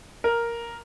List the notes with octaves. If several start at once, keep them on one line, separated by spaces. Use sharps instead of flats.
A#4